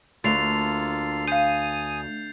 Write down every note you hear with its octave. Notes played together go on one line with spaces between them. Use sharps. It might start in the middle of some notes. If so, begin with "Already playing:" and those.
D2 A#3 F4 A4 A6 C7 F7
F5 G#5 D#6 G6 D#7